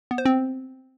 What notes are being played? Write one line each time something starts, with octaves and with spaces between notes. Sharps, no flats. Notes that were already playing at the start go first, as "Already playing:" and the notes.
B3
C5
C4